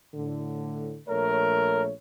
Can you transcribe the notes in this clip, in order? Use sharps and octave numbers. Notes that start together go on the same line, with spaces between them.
A2 D3
A#1 A3 A#4 C#5